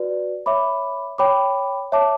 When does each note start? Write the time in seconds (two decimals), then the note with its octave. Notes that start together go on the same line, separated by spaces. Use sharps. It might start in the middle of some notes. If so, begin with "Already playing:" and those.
Already playing: F#4 B4 D5
0.46 C#5 E5 B5 D6
1.18 C#5 G5 B5 D6
1.92 C#5 E5 A5 D6